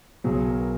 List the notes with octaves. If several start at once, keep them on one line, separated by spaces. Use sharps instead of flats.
B1 B2 F#3 G#4
A#4